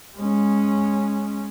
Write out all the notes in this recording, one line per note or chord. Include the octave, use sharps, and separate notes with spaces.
G#3 C#4